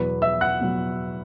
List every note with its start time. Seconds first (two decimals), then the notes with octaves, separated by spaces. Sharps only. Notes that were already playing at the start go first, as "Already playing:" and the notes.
Already playing: E2 B2 F#3 B4 B5
0.22 E5 E6
0.41 F#5 F#6
0.61 B2 F#3